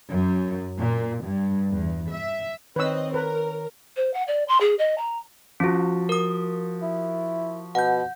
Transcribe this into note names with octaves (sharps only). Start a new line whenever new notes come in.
F#2
A#2
G2
E2
E5
D#3 C4 B4 C#5 D#5 E6
A#4 B4
C5
F#5
D5
C6
G#4
D#5
A#5
F3 C#4 F4 F#4
A#4 D#6
E4
B2 F#5 G6